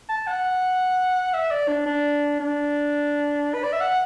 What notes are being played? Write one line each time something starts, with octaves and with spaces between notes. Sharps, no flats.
A5
F#5
E5
D5
D4
D4
D4
B4
D5
E5
F#5